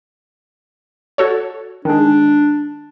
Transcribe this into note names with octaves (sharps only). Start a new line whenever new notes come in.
F#4 A4 C#5
D#3 G#3 D4